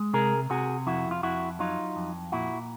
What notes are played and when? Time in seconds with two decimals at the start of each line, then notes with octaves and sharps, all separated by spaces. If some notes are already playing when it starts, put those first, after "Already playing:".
Already playing: G#3
0.13 C3 G#4 A#4
0.50 C3 F#4 G#4
0.87 F2 E4 F#4
1.11 F4
1.23 F2 E4 F#4
1.59 F#3 D#4 F4
1.96 F2
2.32 A#2 E4 F#4